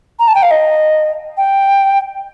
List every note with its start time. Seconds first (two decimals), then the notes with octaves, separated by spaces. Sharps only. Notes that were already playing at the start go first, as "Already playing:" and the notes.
0.19 A#5
0.27 A5
0.34 G5
0.42 F5
0.50 D#5
1.37 G5